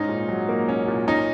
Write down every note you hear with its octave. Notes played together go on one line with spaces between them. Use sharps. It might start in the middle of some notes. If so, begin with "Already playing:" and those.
Already playing: G#2 C#4 D#4
A#2
F#3
A#3
C#4
A#2
C#4 D#4